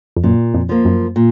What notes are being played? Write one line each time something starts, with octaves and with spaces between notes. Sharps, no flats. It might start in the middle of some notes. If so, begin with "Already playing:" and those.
F2
F#2 A#2
F2
F3 A#3
F#2
A#2